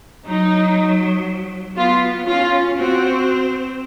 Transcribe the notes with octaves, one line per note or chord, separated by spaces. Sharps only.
F#3 D#4
B3 F4
C#4 F4
C4 F#4